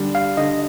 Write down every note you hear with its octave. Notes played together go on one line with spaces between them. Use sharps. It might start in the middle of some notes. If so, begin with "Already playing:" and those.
Already playing: D3 G3
F5
D3 D#5